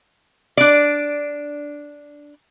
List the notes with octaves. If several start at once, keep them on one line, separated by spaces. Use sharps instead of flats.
D4 D5